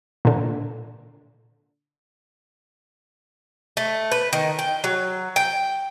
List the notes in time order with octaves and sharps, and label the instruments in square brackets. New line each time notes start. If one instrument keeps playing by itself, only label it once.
[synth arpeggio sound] A#2 D3
[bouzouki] A3
B4
D#3
G5
F#3
G5